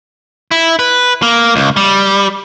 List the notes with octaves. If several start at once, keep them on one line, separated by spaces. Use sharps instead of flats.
E4
B4
A#3
C#2
G3